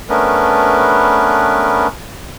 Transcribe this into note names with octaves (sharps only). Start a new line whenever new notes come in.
A3 B3 C#4 D4 A#4 B4